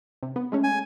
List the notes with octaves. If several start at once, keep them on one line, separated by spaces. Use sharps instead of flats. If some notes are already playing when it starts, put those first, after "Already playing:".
C3
B3
G#3 A3 C#4
G#5